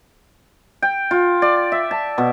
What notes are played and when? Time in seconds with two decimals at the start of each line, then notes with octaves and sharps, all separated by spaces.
0.82 G5
1.11 F4
1.42 D5
1.72 E5
1.91 A5
2.18 B2